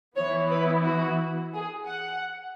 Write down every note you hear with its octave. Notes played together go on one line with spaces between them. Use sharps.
E3 B3 E4 C#5
B4
F#4
G#4
F#5